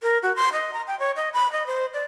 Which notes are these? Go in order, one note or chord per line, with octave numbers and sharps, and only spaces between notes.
A#4
F#4
C6
D#5
A#5
G5
C#5
D#5
B5
D#5
C5
D5